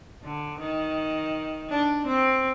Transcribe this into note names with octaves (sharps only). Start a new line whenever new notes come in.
D3
D#3
D4
C4